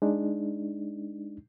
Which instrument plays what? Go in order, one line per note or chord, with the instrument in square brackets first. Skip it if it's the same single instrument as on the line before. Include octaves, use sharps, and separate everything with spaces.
[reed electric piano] G#3 D4 D#4